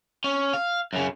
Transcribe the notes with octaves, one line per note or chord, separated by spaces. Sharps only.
C#4
F5
F#2 C#3